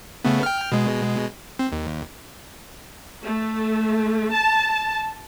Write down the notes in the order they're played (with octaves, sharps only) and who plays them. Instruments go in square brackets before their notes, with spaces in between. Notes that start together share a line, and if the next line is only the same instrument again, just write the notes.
[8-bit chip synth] C#3 A3 B3
G5 F6
B2 G#3
C4
D#2
[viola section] A3
A5